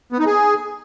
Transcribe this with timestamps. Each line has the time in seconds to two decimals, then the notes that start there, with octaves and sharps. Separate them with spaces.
0.12 B3
0.19 D#4
0.26 G#4